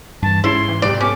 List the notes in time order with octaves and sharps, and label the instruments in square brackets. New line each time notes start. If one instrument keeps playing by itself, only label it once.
[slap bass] G2 E3 [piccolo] A5
[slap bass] G#2 [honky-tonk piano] G#3 C#4 [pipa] E4 [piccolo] C6
[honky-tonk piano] E3
[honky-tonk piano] B1 F2 C3 [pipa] D5
[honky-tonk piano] B3 A4 [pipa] C#4 [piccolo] D6